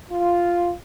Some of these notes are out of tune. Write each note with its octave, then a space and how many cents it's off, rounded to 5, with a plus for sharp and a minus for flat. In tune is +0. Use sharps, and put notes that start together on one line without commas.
F4 +0